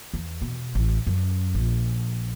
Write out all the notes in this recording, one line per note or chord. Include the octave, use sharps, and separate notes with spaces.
E2
B2
A1
F#2
A#1